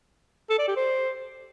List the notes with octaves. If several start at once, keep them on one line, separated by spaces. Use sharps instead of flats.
A4
D5
G4
C5